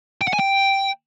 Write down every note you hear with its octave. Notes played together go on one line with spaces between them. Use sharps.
G5
F#5
G#5
G5